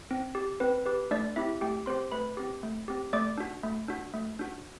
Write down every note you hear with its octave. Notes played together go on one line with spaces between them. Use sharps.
C4
G4
C4 B4
G4 B4
A3 D4 D5
C4 E4 G4 E5
A3 G4 G5
C4 G4 C5 C6
A3 B4 B5
C4 G4
A3
C4 G4
A3 D5 D6
D4 F#4
A3
D4 F#4
A3
D4 F#4